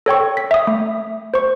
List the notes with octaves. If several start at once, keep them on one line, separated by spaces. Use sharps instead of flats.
A4 C#5 G5 C#6
B6
E5 D#6
A3
C5 C#6